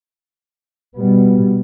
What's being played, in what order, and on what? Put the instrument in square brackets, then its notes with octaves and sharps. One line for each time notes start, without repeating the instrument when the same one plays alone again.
[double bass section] B2 G3 B3